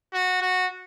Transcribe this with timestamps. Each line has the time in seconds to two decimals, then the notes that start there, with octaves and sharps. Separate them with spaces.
0.13 F#4
0.42 F#4